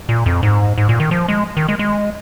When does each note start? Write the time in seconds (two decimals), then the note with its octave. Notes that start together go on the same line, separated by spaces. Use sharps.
0.09 A#2
0.26 F2
0.43 G#2
0.78 G#2
0.89 A#2
1.00 D#3
1.11 F3
1.28 G#3
1.57 D#3
1.68 G#3
1.79 G#3